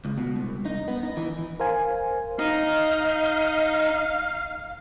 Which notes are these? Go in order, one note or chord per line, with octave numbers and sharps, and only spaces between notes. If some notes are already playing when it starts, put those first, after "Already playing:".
C#2
B2
C2
D#4
B3
D#4
E3
A#4 C5 F5 G#5
D#4 F5